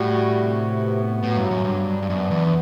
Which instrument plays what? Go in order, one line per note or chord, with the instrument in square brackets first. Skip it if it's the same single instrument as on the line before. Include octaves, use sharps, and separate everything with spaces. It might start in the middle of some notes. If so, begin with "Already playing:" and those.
Already playing: [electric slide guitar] A2 [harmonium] G3 F#4
[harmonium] C3
B3
[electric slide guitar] A2 [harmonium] F#3
[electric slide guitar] G2
F#2
[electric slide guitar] G2 [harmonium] D4
[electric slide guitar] G2
[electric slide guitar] F#2 [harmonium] B3
[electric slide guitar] E2